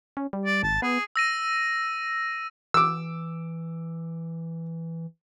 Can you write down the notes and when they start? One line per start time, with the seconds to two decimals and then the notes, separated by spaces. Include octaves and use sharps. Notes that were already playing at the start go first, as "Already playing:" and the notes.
0.17 C#4
0.33 G3
0.45 D5
0.63 G#1 A5
0.82 B3 G#4
1.16 E6 A#6 D#7
2.74 E3 D6 E6